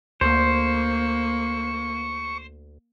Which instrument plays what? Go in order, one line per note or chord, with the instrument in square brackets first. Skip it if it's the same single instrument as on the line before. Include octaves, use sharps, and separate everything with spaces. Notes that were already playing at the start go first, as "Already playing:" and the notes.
[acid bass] D2 [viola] A#3 [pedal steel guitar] C5 [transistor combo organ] C#6